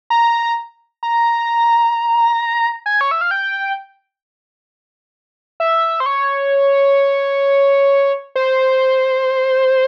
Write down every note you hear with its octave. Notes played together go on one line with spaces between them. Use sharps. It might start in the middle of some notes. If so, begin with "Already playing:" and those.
A#5
A#5
G#5
C#5
E5
F5
G5
E5
C5
C#5
C5